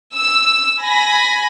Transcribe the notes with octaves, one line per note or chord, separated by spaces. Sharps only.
E6
G#5 B5 A#6